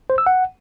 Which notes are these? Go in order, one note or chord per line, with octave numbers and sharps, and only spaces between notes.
C5
E6
F#5